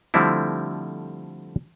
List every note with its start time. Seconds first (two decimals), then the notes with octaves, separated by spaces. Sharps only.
0.14 D3 F3 G3 A3 C4 E4